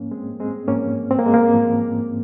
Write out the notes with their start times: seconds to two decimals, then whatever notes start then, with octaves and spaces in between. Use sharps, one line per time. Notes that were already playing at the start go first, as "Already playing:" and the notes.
Already playing: G#2 F3 A#3 C#4
0.11 G#3 C4
0.40 G#3 C4
0.68 G#2 F3 A#3 C#4
1.11 C4
1.19 A#3
1.26 G#3
1.34 A#3
1.54 G#2 F3